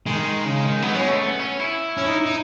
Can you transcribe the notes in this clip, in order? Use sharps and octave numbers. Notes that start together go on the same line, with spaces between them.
D#3 G#3
C#3
D#3
F#3 B3
G#3 C#4
A3
B3
C#4
E4
C#4
D#4
D#4